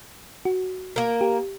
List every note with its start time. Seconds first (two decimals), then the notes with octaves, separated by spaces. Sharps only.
0.45 F#4
0.96 A#3 A#4
1.21 G4